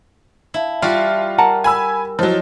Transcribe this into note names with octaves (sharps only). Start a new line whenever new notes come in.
E4 E5 F5 A5
G3 F4 F#4
A#4 F#5 A5 A#5
G#5 B5 E6
F3 F#3 E4 C#5 D#5